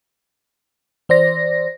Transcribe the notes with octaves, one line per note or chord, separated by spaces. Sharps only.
E3 C5 D5 A#6